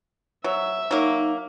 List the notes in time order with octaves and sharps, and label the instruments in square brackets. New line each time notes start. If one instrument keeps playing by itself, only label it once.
[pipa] F#3 [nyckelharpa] E5
[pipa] F#3 A#3 [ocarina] D#4